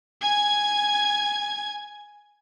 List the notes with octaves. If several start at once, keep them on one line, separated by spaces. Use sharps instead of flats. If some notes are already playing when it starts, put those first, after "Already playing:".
G#5 G#6